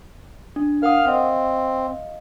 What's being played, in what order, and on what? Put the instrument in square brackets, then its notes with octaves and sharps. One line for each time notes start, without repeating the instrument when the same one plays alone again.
[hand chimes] D4
[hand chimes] A#4 F#5 D#6 [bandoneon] F5 F6
[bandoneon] C4 [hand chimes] D#5 F5